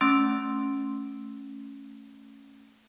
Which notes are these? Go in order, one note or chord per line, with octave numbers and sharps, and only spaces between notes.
A3 C#4 C6 E6 A6 D7